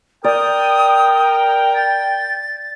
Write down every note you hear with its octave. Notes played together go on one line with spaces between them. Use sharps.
A#4 D5 G5 D#6
A6